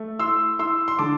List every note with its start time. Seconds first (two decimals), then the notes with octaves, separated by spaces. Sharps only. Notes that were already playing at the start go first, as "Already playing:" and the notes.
Already playing: A3
0.19 E4 C6 E6
0.59 E4 C6 E6
0.88 C6
0.99 D3 A5 D6